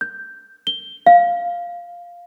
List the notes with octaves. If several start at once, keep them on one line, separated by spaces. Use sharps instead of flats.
G6
G7
F5